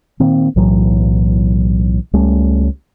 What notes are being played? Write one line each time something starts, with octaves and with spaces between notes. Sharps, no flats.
A#2 D#3 A#3 C4
B1 A2 E3 F#3
C#2 G3 A3 C#4